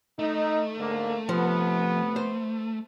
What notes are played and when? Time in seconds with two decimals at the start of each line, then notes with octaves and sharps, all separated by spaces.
0.19 A3 D#4
0.77 G#2 D3 A#3
1.29 C3 F3 B3
2.16 C5